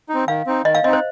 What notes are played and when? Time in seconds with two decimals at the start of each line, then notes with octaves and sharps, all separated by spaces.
0.09 D#4
0.14 C4
0.27 D#3 F5
0.47 C4 D#4
0.65 D#3 D#5
0.75 F5
0.84 C4 D#5
0.88 D#4
0.93 C5